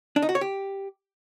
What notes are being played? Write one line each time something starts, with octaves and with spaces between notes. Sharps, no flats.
D4
D#4
F#4
C#5
G4